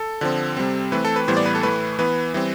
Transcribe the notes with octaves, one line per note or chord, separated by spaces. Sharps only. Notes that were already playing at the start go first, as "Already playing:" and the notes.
Already playing: A4
D3 F3 C4
C3 G3 C4
E3 A3 C4 B4
A4
B4
A2 E3 G3 B3 C5
D5
B4
A4
A2 E3 A3 B4
E3 B3 B4
E3 G3 C4